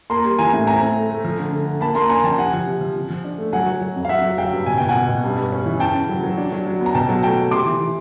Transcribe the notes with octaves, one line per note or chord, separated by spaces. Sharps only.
A#3 A#5 C6
G3
E3 G#5 A#5
A2
C4 G#5 A#5
C4
A3
A3
F3
D3
D3
D3
A#3 A5 B5
A#3 A#5 C6
D4 G#5 A#5
F3 G5 A5
C3 F#5 G#5
F3
C3
F3
F3
F3
D4
A3
F#3 F#5 G#5
F#3
F#3
F2
F5
F#3 E5 F#5
F#3
F#3 F5 G5
G2
B2 G#5
B2 G5
F#5 G#5
B2
B2
G2
G2
C#4
E3
C#3 G5 A5
C#3
F#3
F#3
D4
F#3
F#3
B3
A#5
B2 G5 A5
F#3
A3 G5 A5
A3
C3 C6 D6
E3
E3